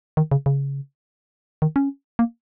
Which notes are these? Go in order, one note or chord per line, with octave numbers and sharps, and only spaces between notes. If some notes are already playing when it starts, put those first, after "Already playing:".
D#3
C#3
C#3
D#3
C#4
A#3